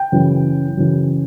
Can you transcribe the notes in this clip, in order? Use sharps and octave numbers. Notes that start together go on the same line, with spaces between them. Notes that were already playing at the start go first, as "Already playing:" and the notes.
Already playing: G5
F#2 C#3 E3
F#2 C#3 E3